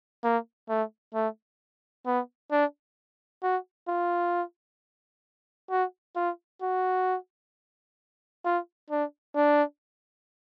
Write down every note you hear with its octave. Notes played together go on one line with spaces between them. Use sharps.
A#3
A3
A3
B3
D4
F#4
F4
F#4
F4
F#4
F4
D4
D4